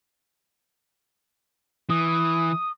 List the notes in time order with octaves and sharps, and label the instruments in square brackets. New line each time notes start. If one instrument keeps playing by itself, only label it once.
[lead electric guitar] E3 [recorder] D#6